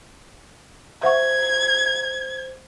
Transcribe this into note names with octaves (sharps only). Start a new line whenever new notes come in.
C5 E5 F#5 C#6 G#6